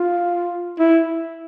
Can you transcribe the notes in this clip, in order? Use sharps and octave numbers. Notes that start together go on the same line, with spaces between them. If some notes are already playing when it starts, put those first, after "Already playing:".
Already playing: F4
E4